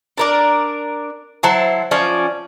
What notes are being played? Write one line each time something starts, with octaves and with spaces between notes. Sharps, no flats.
D4 A#4 D5
F#3 E4 C5 A5
F3 C#4 D5